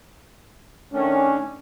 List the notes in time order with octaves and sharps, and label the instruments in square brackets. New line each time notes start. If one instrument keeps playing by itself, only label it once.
[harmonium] D#3 A3 D4 [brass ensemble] C#4